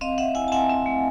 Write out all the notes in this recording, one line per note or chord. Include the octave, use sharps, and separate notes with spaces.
C4 D#5 F5
C4 E5 F#5
E4 F#5 G#5
A5
C4 F#5 G#5
C4
A3